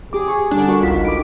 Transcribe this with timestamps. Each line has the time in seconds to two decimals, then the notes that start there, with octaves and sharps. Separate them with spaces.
0.13 G4 G#4 D6
0.28 G#5 C#6
0.51 D3 G3 D4
0.68 F#4 A#4 C#6
0.83 G#1 C#2 D#3 F4 B6
1.05 D#4 B5 D6 D7